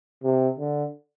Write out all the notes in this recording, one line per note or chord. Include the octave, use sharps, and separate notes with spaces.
C3
D3